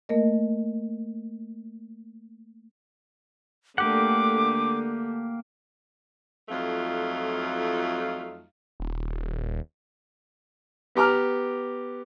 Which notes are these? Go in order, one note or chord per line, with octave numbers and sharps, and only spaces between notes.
A3 A#3 A#4 D#5
D3 A3 A#3 G4 F#5 D6
F2 F#3 A3 D#4 F4 F5
D#1
B3 G4 A#5 D6 F6